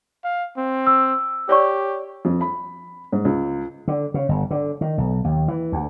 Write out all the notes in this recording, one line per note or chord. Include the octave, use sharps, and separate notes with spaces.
F5
C4
E6
G4 C#5 D5 C#6
F2
B5
G#2
C#2
D3
C#3
G1
D3
D#3
B1
D#2
E3
D2